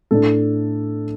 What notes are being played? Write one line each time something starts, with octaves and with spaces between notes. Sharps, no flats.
A2 A3 D4 A4